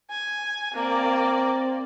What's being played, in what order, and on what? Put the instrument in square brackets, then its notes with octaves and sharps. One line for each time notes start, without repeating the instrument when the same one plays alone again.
[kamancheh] G#5
[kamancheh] A#3 D5 [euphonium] C4